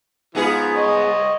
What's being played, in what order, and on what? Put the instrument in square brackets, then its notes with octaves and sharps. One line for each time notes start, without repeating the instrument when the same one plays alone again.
[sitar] G#2 B3 G#4 [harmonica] F3
[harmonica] C5 C#5 D#5